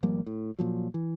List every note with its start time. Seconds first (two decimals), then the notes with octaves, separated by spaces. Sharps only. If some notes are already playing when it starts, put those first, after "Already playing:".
0.03 G#1 F3 G3 A#3
0.26 A2
0.59 A#2 F3 F#3
0.94 E3